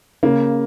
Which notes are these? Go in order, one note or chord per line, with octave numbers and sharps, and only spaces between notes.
C#3 A#3